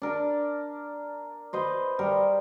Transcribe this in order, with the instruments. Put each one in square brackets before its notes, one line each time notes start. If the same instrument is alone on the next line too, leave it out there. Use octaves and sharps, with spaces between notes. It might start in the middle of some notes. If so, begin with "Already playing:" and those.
[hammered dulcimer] D4 A#4
B4 C5 D#5
G3 A#4